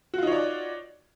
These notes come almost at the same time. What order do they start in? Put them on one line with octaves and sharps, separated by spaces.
F#4 F4 D#4 C#5 D5